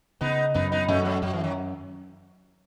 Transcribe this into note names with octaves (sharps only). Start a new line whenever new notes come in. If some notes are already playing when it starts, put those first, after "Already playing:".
C#3 B3 D#4
F#2 B3 D#4
B3 D#4
F#2 A3 C#4
B3
F#3 A3
F#2 F#3
E3
D#3 F#3